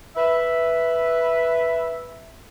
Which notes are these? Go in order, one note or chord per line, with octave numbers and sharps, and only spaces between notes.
B4 E5